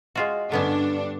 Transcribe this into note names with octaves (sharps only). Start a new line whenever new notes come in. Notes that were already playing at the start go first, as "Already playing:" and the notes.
G#3 F4 F#4
G2 D3 B3 C#4 D4